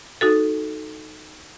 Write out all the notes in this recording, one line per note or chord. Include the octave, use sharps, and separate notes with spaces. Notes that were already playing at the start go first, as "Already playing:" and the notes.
D#4 F#4 A4